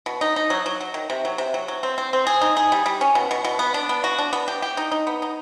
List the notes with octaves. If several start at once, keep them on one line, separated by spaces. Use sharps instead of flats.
B2
D#4
D#4
F#3
F#3
F#3
D#3
C3
F#3
C3
F#3
F#3
C4
C4
C4
G#4
D#4
G#4
G3
G3
C#4
B2
B2
B2
B3
D4
B3
F#4
D4
B3
G4
G4
D#4
D#4
B3
D#4